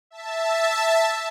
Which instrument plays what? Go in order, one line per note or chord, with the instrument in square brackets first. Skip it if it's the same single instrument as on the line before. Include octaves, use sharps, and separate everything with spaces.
[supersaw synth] E5 A5